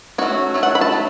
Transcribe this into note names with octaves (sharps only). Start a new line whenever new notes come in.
F#3 A3 C#4 F#4
F#3 A3 C#4
F#5
B5
A5
F#3 A3